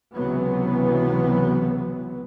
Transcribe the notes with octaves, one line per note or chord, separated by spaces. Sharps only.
C#2 C3 E3 F#3 B3